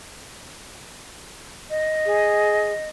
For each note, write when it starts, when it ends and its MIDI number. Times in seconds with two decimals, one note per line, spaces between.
1.70 2.89 75
2.06 2.72 68